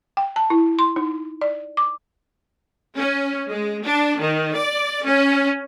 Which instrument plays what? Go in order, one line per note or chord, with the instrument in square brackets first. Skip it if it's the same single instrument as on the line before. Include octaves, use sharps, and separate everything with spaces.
[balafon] G5
A5
E4
C6
D#4
D5
D6
[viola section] C#4
G#3
D4
D#3
D5
C#4